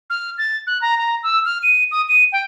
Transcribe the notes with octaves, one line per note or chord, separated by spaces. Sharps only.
F6
A6
F#6
A#5
A#5
E6
F6
D#7
D#6
D#7
G5